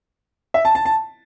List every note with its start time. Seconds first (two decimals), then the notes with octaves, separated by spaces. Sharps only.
0.54 E5
0.65 A5
0.75 A5
0.85 A5